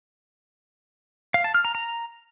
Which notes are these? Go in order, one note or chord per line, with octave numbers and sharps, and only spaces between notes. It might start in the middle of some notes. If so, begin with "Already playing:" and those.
F5
A5
F6
A#5
A#5